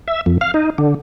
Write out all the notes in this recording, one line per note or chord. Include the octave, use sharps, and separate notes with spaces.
E5
F2
F5
D#4
D3